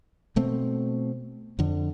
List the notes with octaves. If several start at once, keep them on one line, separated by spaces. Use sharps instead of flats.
B2 A3 C4
F2 D3